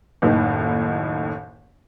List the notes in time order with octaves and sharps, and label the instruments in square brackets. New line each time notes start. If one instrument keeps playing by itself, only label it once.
[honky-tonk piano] F#1 D#2 A2 D#3 D#4